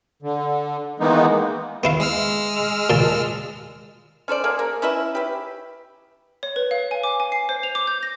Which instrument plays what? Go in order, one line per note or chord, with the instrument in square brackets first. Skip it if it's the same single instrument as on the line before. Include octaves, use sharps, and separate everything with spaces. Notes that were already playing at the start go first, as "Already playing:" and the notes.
[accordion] D3
D#3 E3 G#3 A#3 B3 D#4
[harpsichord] B3 E4 F5
[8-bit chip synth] G#3 E6 F6
[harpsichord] A#2 A5
[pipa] C#4 A4 C5 D5
A#3 G#4 A4
A#3 A#4
C#4 E4 B4 E5
G4 B4
[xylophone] C#5
B4
F5
G#5
D6
G#5
C7
C5
F7
D6
G6
A#6